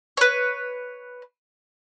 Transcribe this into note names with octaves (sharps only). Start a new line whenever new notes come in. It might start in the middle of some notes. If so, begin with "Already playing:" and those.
B4 C#5